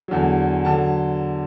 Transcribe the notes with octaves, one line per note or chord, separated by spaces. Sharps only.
E2 D3 F#3
D3 F#3 A5